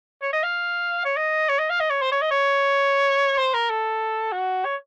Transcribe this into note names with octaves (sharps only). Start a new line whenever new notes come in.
C#5
D#5
F5
C#5
D#5
C#5
D#5
F5
D#5
C#5
C5
C#5
D#5
C#5
C5
A#4
A4
F#4
C#5